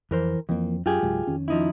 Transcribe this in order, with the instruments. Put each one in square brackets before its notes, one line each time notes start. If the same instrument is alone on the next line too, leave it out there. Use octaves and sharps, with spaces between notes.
[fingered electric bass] F2 [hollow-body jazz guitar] E3 A#4 C5
[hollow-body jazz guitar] F2 [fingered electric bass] E3 A#3
[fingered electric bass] F#2 [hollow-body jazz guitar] F4 G4 G#4
[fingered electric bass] C#2 G#2 F#3
F2 D#3 C#4
[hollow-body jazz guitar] F3 D#4 E4